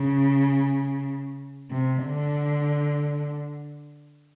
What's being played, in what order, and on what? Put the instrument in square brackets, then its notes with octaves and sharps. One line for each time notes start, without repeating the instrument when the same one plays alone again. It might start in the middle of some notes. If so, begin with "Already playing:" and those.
Already playing: [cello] C#3
C3
D3